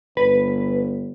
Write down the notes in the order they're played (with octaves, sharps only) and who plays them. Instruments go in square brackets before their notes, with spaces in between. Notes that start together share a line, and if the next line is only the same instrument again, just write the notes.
[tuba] G1 [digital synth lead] B4